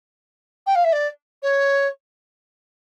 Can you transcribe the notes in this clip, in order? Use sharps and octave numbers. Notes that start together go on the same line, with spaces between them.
G5
F5
E5
D5
C#5